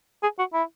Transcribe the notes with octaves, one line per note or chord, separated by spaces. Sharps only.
G#4
F#4
E4